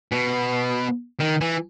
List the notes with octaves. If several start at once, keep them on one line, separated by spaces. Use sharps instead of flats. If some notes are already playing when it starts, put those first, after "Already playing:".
B2
D#3
E3